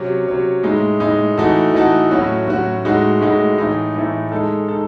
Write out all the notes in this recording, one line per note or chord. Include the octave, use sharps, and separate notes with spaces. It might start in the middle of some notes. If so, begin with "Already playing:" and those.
Already playing: C3 F#3 C#4
C3 F#3 C#4
A2 G#3 D#4
A2 G#3 D#4
E3 A3 D#4 F#4 A4
E3 A3 D#4 F#4 A4
A2 F#3 C#4 F#4
A2 F#3 C#4 F#4
A2 G#3 D#4 F#4
A2 G#3 D#4 F#4
A2 E3 A3 D#4
A2 E3 A3 D#4
G#3 D#4 A4
D#4 A4